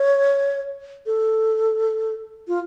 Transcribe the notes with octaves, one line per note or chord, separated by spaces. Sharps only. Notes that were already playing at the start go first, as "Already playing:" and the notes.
Already playing: C#5
A4
F4